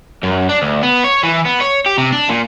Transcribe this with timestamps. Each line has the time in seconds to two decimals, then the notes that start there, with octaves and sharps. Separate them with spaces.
0.23 F#2
0.49 D4
0.62 D2
0.83 B3
1.04 C#5
1.23 E3
1.45 B3
1.60 C#5
1.86 G4
1.98 C3
2.12 D4
2.29 A#2